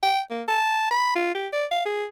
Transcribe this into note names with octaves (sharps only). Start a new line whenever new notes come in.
G5
A#3
A5
B5
F4
G4
D5
F5
G#4